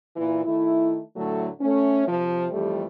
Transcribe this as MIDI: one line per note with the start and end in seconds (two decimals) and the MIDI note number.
0.17 0.43 46
0.17 0.43 52
0.45 1.01 51
0.45 1.01 57
0.45 1.01 64
1.17 1.48 45
1.17 1.48 50
1.17 1.48 54
1.17 1.48 57
1.61 2.08 57
1.61 2.08 61
2.08 2.47 48
2.08 2.47 53
2.52 2.87 41
2.52 2.87 52
2.52 2.87 55
2.52 2.87 57
2.52 2.87 67